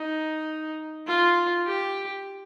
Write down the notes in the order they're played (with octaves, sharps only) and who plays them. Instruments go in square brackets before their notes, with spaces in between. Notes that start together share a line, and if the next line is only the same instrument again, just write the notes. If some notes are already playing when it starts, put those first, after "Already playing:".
Already playing: [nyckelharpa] D#4
F4
G4